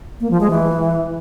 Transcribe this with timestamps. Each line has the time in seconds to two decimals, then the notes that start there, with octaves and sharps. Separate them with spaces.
0.21 A#3
0.31 F3
0.41 G#3
0.50 E3